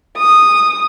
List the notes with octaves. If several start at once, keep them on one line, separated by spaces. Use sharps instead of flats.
D#6